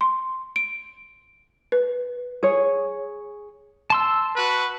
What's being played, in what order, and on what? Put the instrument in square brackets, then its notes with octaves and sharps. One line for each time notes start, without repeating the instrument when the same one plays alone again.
[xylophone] C6
D7
B4
[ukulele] G#4 C#5
[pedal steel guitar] A5 C6 E6
[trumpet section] F#4 B4